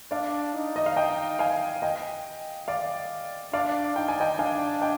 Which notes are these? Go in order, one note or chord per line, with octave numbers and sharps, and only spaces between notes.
D4 D5 F5
D#4
D#5
F5
D#5 G5
F5 G#5
D#5 G5
D5 F5
D4 D5 F5
D#4 G5
G#5
D#5 G5
D4 F5 G#5
D#5 G5